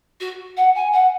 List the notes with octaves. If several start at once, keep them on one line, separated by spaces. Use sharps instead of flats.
F#4
F#5
G#5
F#5